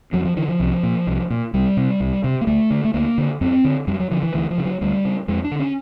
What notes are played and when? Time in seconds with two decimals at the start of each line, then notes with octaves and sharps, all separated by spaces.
0.13 F2 F#3
0.25 F3
0.37 D3 E3
0.48 F3
0.60 C2
0.83 A#2
1.07 C2
1.30 A#2
1.53 C2 G3
1.77 C3
2.00 C2
2.24 C3
2.41 A#3
2.47 D2 A3
2.71 D3
2.84 A3
2.94 D2 A#3
3.18 D3
3.41 F#2 C4
3.64 D3
3.87 F#2 G3
3.99 F#3
4.11 D3 F3
4.23 E3
4.34 D2 E3
4.51 F3
4.58 C#3
4.65 F#3
4.81 D2 G3
5.05 C#3
5.28 F2 G#3
5.44 D4
5.51 D3
5.59 C#4